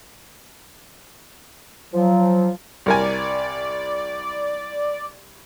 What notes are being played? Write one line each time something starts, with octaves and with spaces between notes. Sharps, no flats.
F3 F#3
C2 A#4 D5 G#5